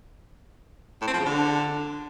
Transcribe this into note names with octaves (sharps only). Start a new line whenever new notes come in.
A2
C4
F3
C#3
D3